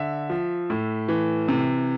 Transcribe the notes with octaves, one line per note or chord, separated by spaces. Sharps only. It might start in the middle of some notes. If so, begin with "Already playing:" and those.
Already playing: D3 E5
F3
A2
E3
C3